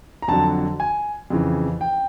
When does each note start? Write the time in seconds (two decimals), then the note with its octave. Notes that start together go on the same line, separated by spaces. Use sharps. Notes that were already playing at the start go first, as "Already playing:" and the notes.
0.22 A#5
0.28 F2 D3 F#3 A5
0.80 G#5
1.30 F2 C#3 E3
1.81 G5